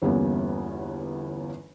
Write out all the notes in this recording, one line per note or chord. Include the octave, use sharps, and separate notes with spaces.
G1 E2 G3 A#3 B3 C#4